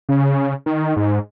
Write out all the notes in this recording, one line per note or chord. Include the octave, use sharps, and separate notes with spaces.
C#3
D#3
G#2